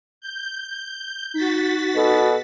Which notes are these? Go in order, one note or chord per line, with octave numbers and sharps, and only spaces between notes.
G6
D#4 F#4 A6 B6
B2 A4